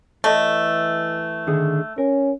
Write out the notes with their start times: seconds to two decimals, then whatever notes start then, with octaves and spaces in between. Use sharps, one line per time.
0.24 E3 A3 C#5 D#5
1.47 D3 D#3 G#4
1.98 C#4 A#4